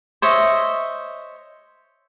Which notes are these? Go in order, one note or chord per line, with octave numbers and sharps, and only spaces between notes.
C5 C#5 D#5 E5